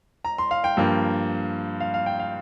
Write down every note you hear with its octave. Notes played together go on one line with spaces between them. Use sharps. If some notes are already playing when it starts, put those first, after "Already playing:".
A#5
C6
F5
G5
G2 F3 A#3
F5
F5
G5
F5